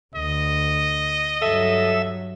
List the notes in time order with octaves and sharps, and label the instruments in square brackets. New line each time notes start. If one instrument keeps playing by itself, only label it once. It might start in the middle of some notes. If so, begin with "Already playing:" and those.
[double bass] D2 [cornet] D#5
[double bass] G2 F#3 [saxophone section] A4 [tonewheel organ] E5